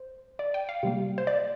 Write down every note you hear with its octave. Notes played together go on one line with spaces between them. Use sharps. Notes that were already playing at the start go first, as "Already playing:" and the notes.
Already playing: C5
D5
G5
F5
C3 G3 A#3
C5
D5